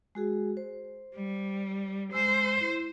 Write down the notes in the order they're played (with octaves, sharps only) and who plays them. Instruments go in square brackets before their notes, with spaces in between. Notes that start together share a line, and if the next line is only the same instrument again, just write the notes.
[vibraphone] G#3 F#4 G#4
C5
[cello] G3
[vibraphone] G#3 E6 [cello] C5
[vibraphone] E4